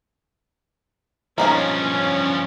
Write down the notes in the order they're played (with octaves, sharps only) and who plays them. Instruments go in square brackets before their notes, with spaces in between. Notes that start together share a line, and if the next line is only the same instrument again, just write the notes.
[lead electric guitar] G2 F3 [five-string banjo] A#3 D#4 F5 [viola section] C#4